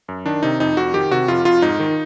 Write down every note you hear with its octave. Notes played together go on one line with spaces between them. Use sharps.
F#2
D#3 D4
C3 D#4
F2 D#4
F2 F#4
D#3 G4
C3 F#4
F2 F4
F2 F4
G#2 D#4
D#3